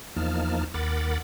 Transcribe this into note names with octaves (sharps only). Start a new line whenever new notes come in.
E2 F3 A#3 D#4 A5 F6
D#2 A#4 F#5 B5 D6 A6